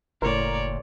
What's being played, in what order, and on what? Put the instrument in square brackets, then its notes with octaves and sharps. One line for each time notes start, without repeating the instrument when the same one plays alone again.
[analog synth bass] F#1 [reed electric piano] A2 C6 [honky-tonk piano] A#4 [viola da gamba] C#5 D5